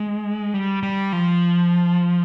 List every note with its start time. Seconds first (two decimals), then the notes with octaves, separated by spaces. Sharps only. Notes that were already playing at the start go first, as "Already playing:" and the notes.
Already playing: G#3
0.54 G3
0.83 G3
1.13 F3